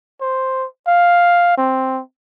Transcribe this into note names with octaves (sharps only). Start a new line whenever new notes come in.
C5
F5
C4